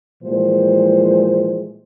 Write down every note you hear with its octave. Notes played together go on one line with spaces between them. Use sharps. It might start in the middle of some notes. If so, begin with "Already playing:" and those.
A#2 E3 F3 G3 G#3 C5